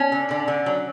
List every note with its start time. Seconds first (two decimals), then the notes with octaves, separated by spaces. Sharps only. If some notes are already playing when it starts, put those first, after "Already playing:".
Already playing: C#4
0.12 D3
0.31 D3
0.48 D3
0.66 F#3